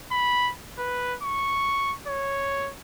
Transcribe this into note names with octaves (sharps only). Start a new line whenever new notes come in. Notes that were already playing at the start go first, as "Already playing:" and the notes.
B5
B4
C#6
C#5